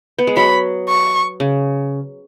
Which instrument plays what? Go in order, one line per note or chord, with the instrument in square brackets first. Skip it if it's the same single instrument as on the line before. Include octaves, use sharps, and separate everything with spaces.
[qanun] B3
G#3
[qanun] F#3 [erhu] B5
[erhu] C#6
[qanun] C#3